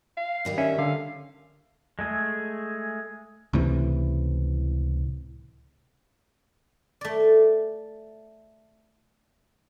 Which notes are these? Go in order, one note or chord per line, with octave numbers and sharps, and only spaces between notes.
F5
G2 D#3 G3
C#4 E5
D3 F5
G#3 A3 G#4
C#2 A2 C3 E3
A3 D5